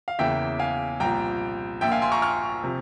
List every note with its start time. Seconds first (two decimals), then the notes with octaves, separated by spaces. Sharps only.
0.08 F5
0.19 E2 C#3 E3 A#3 E4 E5 G5
0.59 F5 G#5
1.00 C2 A#2 F3 G5 A#5
1.81 A#1 A#2 F3 A#3 E5 G5
1.92 F5 G#5
2.02 G#5 C6
2.12 A#5 C#6
2.22 C#6 F6
2.64 C3 F3